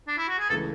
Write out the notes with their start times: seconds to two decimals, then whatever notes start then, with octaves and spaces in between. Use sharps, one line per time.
0.08 D4
0.17 E4
0.28 F#4
0.39 G#4
0.50 C#2 C#3 E3 A3 A4